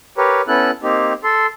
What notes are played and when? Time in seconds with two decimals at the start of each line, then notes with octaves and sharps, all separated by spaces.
0.18 G4 A#4 B4 C#5
0.48 B3 C#4 E4 A4 F#6
0.83 A#3 C4 D#4 G4
1.24 A4 C6